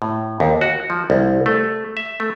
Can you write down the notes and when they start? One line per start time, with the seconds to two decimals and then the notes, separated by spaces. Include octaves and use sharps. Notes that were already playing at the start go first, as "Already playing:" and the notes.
0.02 A2
0.40 D#2
0.61 F#4
0.90 F3
1.10 C2
1.46 A3
1.97 E5
2.20 A3